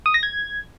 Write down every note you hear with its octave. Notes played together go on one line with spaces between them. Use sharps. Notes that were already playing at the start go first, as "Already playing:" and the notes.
D#6
A#6
G#6